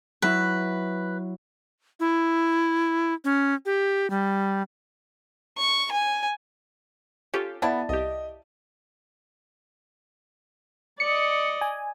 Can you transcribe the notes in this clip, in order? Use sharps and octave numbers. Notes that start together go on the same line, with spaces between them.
F#3 E4 B4
E4
C#4
G4
G3
C#6
G#5
C#4 F4 G4 A4
B3 E4 D5 A5
C2 G4 D#5
D5 D#5 C#7
G#5